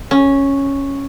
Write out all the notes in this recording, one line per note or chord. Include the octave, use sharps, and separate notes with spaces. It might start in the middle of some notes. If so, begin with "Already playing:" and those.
C#4